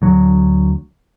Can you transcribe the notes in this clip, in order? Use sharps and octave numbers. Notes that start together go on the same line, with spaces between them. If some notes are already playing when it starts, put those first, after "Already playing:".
D2 F#3